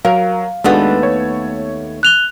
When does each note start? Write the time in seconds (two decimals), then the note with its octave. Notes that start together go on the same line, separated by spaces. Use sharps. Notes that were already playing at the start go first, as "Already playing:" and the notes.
0.05 F#3 A#4 F5
0.64 D#2 G#3 A3 B3 D4 F#4
1.03 C#5
2.03 F#6 F7 G7